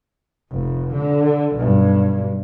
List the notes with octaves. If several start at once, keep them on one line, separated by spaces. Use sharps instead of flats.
F1
D3
B1 G2